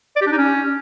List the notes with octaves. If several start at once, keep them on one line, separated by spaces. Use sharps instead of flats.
D5
G4
D4
D#4
C#4